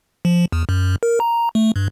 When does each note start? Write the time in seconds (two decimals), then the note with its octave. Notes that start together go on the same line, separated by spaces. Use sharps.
0.25 F3
0.52 E2
0.69 F#2
1.03 A#4
1.20 A#5
1.55 A3
1.76 G2